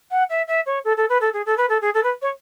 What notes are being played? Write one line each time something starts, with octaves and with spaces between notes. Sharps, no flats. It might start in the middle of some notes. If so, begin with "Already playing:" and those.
F#5
E5
E5
C#5
A4
A4
B4
A4
G#4
A4
B4
A4
G#4
A4
B4
C#5